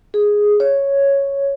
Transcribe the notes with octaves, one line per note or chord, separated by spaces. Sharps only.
G#4
C#5